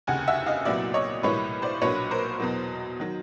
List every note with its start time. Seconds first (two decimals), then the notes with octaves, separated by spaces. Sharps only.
0.07 F1 D#2 C#3 F#5 G#5
0.27 E5 F#5
0.46 D#5 F5
0.65 C2 A#2 F#3 B3 E4 D5 E5
0.94 C#5 D#5
1.23 B1 A2 E3 G3 A#3 B4 C#5
1.62 C5 D5
1.82 B1 A#2 F#3 A#3 D4 B4 C#5
2.11 A#4 C5
2.40 E2 B2 F#3
3.00 D#3 F#3